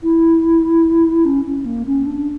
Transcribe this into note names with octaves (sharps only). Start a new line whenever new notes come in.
E4
C#4
C#4
A#3
C#4
D4